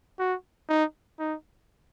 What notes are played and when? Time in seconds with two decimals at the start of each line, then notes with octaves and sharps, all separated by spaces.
0.19 F#4
0.69 D#4
1.19 D#4